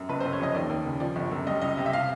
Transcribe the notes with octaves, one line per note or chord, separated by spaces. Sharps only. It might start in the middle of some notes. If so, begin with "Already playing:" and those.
Already playing: F#2
F#1 B4
F#1 C5
C#5
F2 D#5
D#2 D5
D#2
C#3
F3 D5
G1
F#2
G3 D#5
C#2 D#5
C3
E5
F5